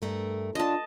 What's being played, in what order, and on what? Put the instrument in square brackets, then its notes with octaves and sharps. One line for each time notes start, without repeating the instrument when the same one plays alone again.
[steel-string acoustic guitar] G2 A3 A#4
[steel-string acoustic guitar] D3 [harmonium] D4 F4 [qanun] D#5 A5